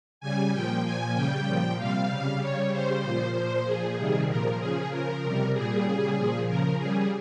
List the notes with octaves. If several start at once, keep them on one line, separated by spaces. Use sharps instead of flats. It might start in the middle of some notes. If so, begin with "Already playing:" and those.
C#3 G3 G#5
A#2 F3 G5
A#2 F3 G#5
C#3 G3 G5
A#2 F3
C3 G3 F5
C#3 G3
C#3 G3 C#5
C#3 G3 C5
A#2 F3
A#2 F3 C5
A#2 F3 G#4
C3 D#3 G3
A#2 F3 A#4
C#3 F3 G#4
C#3 F3 A#4
C3 G3
A#2 G3 G#4
C#3 G3
A#2 F3
C#3 F3 A#4
C#3 G3 G#4